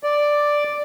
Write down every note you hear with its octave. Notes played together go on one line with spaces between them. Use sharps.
D5